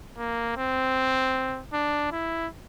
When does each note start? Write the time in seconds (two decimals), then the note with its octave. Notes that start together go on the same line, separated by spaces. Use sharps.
0.18 A#3
0.56 C4
1.73 D4
2.12 E4